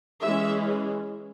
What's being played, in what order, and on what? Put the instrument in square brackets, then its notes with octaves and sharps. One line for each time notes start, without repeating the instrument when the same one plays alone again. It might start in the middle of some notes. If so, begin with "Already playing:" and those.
[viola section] E3 G#3 C#4 E5